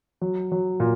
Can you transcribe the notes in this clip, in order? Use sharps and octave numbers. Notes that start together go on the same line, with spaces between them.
F#3
F#3
A#2